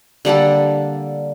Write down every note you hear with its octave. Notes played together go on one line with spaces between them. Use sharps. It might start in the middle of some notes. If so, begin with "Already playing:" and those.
D3 G3 A#3 A4